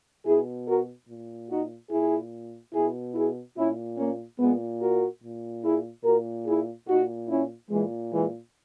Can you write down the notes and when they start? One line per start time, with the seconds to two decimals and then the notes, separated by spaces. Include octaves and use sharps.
0.25 B2 E4 G#4
0.67 F#4 A#4
1.08 A#2
1.49 D#4 F#4
1.90 A#2 E4 G#4
2.73 B2 E4 G#4
3.15 E4 G#4
3.56 A#2 C#4 E4
3.98 A#3 C#4
4.39 A#2 G#3 B3
4.81 F#4 A#4
5.22 A#2
5.63 E4 G#4
6.04 A#2 F#4 A#4
6.46 E4 G#4
6.88 A#2 D#4 F#4
7.29 C#4 E4
7.70 A#2 E3 G#3
8.11 E3 G#3